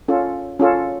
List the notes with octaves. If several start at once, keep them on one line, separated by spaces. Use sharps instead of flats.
C#4 F4 A4
C#4 F4 A4